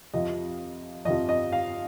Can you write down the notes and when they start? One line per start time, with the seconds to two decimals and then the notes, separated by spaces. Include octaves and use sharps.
0.14 F2 C3 F3 D#5
1.05 F2 D#5
1.08 C3 F3
1.29 D#5
1.53 F5